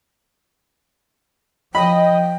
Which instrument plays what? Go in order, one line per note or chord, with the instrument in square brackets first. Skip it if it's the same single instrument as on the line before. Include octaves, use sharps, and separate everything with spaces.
[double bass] F3 [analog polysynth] D#5 [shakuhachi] G5 [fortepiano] B5